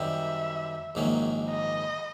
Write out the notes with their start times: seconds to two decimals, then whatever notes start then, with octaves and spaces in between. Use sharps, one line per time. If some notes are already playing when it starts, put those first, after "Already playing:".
Already playing: F#2 D#3 G3 C4 E5
0.95 A#1 G#2 D#3 F#3 A#3
1.50 D#5